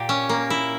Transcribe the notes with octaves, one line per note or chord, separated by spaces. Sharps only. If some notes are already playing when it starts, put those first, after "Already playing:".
Already playing: A#2 G4
C#4
A#3
E4